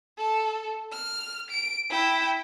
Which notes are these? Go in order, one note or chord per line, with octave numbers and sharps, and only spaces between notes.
A4
F6
D7
E4 G5